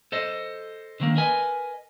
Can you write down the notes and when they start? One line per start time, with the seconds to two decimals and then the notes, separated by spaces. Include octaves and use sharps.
0.12 A4 C5 D#5
1.00 D3 D#3 A#3
1.16 A#4 B4 D#5 G#5